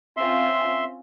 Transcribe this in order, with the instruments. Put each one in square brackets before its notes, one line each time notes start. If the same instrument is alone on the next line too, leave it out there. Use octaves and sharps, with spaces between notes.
[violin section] C4 C#4 F4 [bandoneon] E5 C6